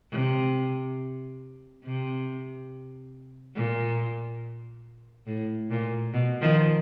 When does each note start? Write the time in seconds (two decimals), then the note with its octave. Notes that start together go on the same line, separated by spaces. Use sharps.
0.12 C3
1.84 C3
3.55 A#2
5.27 A2
5.71 A#2
6.14 B2
6.41 D#3 F3